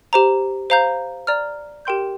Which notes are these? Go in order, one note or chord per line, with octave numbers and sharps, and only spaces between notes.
G4 C5 A#5
C5 F5 A#5 G6
D5 A#5 F6
G4 A#4 G5 C6 G6